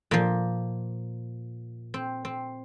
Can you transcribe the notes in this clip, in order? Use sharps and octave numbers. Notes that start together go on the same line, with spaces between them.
A#2 F3 A#3
C4
C4